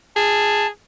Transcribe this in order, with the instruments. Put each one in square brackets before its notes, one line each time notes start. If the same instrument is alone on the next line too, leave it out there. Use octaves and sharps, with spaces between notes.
[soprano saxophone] G#4 [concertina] A5